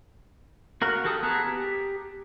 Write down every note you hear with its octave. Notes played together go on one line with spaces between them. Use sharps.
F#4 A#4 F5 F#5
F#4 G4 A4 A5 D#6
B3 G#4 A5 A#5 F#6
G4